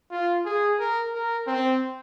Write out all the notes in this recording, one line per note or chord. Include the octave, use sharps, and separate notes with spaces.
F4
G#4
A#4
A#4
C4